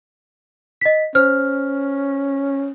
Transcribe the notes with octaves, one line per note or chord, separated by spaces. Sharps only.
D#5 B6
C#4 C5 F6